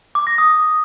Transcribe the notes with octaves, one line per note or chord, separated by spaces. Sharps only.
D6
A#6
D#6